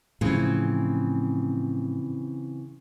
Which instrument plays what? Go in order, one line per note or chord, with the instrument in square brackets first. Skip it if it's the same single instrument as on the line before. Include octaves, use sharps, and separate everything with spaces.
[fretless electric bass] A2 F3 [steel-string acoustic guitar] C#3 E3 C4